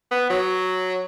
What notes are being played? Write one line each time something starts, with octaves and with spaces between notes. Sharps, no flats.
B3
F#3